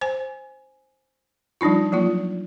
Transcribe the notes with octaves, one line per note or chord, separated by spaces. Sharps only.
C5 G#5
F3 G3 D4 D#4 F4
F3 F#3 A#3 F4